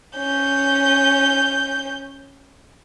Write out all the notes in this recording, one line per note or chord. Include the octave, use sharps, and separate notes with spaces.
C#4 G6